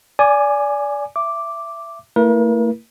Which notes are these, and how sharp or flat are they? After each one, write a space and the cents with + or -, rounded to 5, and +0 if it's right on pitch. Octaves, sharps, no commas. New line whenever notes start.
D5 -25 G#5 +0 D6 +25
E5 +20 D6 +0
A3 +45 E4 +0 A#4 +45